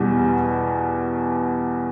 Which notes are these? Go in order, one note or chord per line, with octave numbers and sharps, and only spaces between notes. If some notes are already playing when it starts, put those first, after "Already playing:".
Already playing: E2 B2 G3